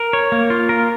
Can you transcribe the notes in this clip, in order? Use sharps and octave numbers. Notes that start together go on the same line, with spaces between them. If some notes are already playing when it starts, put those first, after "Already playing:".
Already playing: A#4
C#5
A#3
F4
A#4